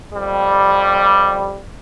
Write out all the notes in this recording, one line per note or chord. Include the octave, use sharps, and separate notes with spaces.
F2 G3